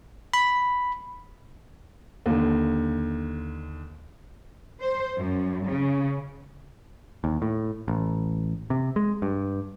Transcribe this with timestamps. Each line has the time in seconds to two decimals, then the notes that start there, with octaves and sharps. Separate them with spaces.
0.34 B5
2.26 D#2 D3
4.81 C5
5.17 F#2
5.69 C#3
7.24 D#2
7.42 A2
7.88 A1
8.70 C3
8.96 G#3
9.22 G2